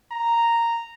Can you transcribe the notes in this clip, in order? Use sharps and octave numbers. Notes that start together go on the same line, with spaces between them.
A#5